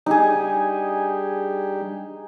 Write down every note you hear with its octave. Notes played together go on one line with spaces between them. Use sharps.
G3 D4 D#4 G4 G#4